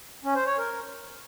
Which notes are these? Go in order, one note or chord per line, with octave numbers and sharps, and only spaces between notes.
C#4
C5
C#5
A#4